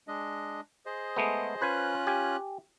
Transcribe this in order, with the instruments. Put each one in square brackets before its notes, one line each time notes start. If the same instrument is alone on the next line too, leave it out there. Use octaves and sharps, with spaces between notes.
[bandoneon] G#3 D4 D#5
G#4 C5 D#5
[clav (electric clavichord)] G#3 A3 B3
[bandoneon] C#4 F4 F#6 [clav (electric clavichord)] B4 C5 G#5
[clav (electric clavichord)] G4 G#5